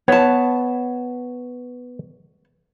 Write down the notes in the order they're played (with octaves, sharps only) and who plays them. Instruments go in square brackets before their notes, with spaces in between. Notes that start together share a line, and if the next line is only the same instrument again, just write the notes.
[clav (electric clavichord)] B3 [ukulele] C#5 A5